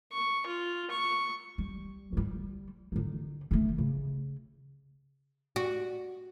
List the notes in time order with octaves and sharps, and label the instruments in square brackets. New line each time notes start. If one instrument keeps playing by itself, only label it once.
[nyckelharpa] C#6
F4
C#6
[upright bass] G3
D3 G3
D3 D#4
D3 A3
C#3
[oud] F#4